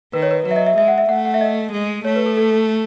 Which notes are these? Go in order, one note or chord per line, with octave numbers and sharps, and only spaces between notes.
D#3 B4
C#5
B4
F#3 B4
E5
D#5
E5
G#3 E5
F#5
E5
A3 F#5
F#5
E5
D#5
G#3
A3 C#5
B4
A4
A4